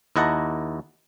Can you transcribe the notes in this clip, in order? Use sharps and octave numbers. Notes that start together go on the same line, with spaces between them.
D#2 E4 D#5 F#5 A5 A#5